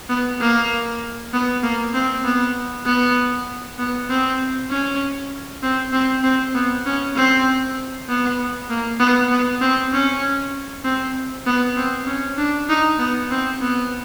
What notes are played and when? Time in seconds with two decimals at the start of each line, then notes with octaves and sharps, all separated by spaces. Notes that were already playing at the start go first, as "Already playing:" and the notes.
0.09 B3
0.41 A#3
1.33 B3
1.63 A#3
1.94 C4
2.25 B3
2.86 B3
3.79 B3
4.10 C4
4.70 C#4
5.63 C4
5.93 C4
6.24 C4
6.55 B3
6.86 C#4
7.16 C4
8.09 B3
8.70 A#3
9.00 B3
9.31 B3
9.61 C4
9.93 C#4
10.84 C4
11.47 B3
11.77 C4
12.07 C#4
12.38 D4
12.69 D#4
12.99 B3
13.31 C4
13.61 B3